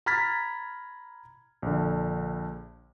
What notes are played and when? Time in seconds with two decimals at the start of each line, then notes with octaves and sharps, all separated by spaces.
0.06 A#5 B5 F6 G#6 A6 B6
1.62 A#1 D3